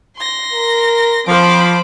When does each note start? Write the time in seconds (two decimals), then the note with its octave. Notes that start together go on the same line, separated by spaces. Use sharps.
0.16 C6 A#6
0.54 A#4
1.27 F3 C4 C5 B5 D6